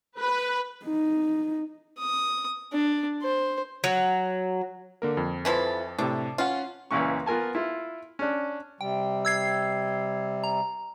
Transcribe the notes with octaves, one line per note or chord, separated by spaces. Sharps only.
B4
D#4
D#6
D4
C5
F#3
D3 A#3 A#4
F2
E3 F3 A4
A2 C3 D4
C#4 F4 F#5
C#2 A#2 E3 C#4 C#6
B3 F4 A#4 G#5 A5
E4 F4
C#4 D4
C3 G3 G5
E6 G#6 C7
A#5